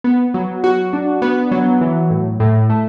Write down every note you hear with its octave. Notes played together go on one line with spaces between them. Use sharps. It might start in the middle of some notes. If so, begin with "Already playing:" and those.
B3
F#3
F#4
D4
B3
F#3
E3
A2
A2
A3